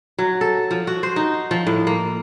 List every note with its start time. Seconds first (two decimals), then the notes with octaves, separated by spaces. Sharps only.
0.18 F#3
0.41 A4
0.71 F3
0.87 F#4
1.03 C5
1.16 D#4
1.51 F3
1.67 A2
1.87 A#3